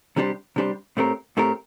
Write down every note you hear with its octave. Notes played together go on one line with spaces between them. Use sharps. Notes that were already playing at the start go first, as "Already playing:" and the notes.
C3 G3 D4 G4 C5
C3 G3 D4 G4 C5
A2 A3 C4 G4 A#4
A2 A3 C4 G4 A#4